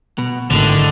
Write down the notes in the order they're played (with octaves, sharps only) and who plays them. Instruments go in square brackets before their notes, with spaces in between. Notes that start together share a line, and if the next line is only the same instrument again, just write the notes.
[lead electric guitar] B2
[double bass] G#1 D#3 [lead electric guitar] D2 A2 [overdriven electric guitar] D3